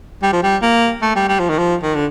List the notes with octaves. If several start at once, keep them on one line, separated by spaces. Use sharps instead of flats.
G3
F3
G3
A#3
A3
G3
G3
F3
D#3
F3
D#3
D3